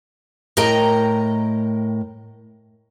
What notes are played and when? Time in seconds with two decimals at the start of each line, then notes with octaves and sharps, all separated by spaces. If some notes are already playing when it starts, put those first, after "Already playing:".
0.57 A2 A#4 D#5 G5 A#5